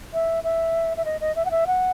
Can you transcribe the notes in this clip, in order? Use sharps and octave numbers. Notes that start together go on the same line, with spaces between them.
E5
E5
E5
D#5
D#5
E5
F#5
E5
F#5